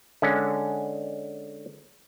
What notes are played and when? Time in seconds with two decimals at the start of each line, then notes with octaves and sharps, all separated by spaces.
0.22 D3 G#3 C#4